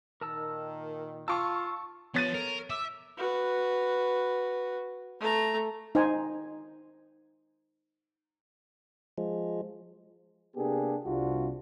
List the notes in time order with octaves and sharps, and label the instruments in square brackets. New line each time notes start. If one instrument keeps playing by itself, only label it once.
[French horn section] A#2 D#3 [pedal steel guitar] A#4 A5 E6
[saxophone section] F4 [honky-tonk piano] A5 C#6 [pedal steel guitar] E6
[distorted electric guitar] F3 [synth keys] B3 [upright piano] C#5 A6 D#7
[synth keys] A4 [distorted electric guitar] A#4
[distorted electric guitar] E5 [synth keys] D6 E6
[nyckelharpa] F#4 B4
A3 A#5
[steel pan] D#4 C5 G#5
[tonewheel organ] F3 G#3
[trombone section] C3 A#3 B3 D4 G4 G#4
C2 C3 G3 D4 F4 F#4